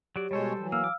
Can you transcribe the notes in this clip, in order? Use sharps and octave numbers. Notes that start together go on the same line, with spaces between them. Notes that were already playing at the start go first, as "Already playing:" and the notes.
F#3 G4 D5
B2 G3 G#3 A4 C5 C#5
E3 F#3
A#3 F5 E6 F6
D6